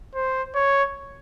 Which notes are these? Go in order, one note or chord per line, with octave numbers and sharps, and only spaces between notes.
C5
C#5